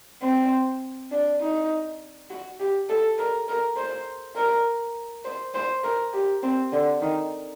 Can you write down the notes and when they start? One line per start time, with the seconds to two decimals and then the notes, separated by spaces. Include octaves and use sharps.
0.23 C4
1.11 D4
1.41 D#4
2.30 F#4
2.60 G4
2.89 A4
3.18 A#4
3.48 A#4
3.77 C5
4.36 A#4
5.24 C5
5.54 C5
5.84 A#4
6.13 G4
6.43 C4
6.72 D3
7.01 D#3